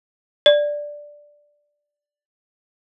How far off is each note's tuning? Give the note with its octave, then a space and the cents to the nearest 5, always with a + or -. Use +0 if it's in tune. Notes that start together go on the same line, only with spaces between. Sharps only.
D5 +0